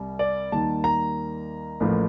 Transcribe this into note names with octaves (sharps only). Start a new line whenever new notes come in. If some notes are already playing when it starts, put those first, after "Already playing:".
Already playing: C2 C3 G3
D5
D#2 D#3 G3 A#3 A5
A#5
A1 A2 F3 A#3